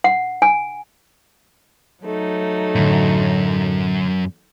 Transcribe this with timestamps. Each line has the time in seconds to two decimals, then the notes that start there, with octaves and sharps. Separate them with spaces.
0.04 F#5
0.42 G#5
2.03 F#3 A3 D#4
2.75 F#2 A2 D3